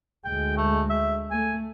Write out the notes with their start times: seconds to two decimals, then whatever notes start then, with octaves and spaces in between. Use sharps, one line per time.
0.25 D2 G#3 G5
0.57 A3
0.90 E5
1.31 A3 G#5